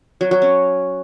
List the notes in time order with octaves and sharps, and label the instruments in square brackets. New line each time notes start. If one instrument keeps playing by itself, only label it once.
[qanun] F#3
F#3
C#4